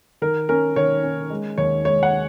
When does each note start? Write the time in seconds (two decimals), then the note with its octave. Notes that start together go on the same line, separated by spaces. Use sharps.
0.22 D#3 A#4
0.49 C#4 A#4
0.76 D#3 C#5
1.03 C#4
1.30 G#3
1.58 D#2 C#5
1.85 G#3 C#5
2.03 F#5